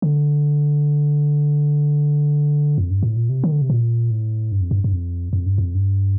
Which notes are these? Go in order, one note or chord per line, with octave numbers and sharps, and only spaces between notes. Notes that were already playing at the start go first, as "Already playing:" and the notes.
D3
F2
G2
A2
A#2
C3
D#3
D3
C3
A#2
A2
G2
F2
G2
G2
F2
F2
G2
F2
G2